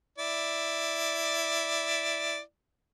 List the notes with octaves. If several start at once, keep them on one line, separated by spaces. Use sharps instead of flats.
E4 D5